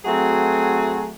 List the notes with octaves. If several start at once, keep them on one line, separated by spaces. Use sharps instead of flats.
F#3 A3 C4 F#4 G#4